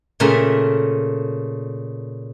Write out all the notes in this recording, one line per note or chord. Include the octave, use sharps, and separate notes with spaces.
A#2 C#3 A3 A#4 E5